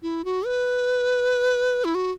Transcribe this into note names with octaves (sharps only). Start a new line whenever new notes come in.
E4
F#4
B4
E4
F#4